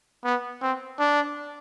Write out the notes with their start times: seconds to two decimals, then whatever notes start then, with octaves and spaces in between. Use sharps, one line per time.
0.24 B3
0.62 C4
0.99 D4